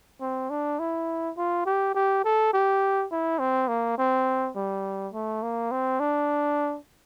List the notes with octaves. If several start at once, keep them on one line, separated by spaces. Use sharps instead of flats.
C4
D4
E4
F4
G4
G4
A4
G4
E4
C4
A#3
C4
G3
A3
A#3
C4
D4